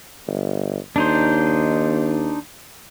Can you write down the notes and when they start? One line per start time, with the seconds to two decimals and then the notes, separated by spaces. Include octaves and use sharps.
0.27 G1
0.96 D#2 D4 D#4 C5